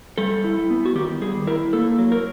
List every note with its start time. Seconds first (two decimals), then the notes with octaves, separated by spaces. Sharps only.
0.18 G3 A4
0.44 E4
0.70 B3
0.86 F#4
0.95 D#3 G4
1.21 G3 G#4
1.47 E4 A#4
1.73 A#3 A4
1.98 F#3
2.12 A#4